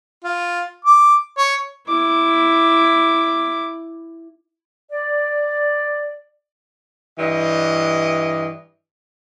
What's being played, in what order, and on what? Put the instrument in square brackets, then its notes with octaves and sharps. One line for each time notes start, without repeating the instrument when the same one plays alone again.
[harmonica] F4
D6
C#5
[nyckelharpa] E4 D6
[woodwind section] D5
[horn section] G2 E3 D5 D#5